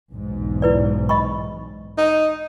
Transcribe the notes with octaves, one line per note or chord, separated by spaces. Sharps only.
B1 E2 G#2
E4 B4 D5
D#5 B5 C#6
D#4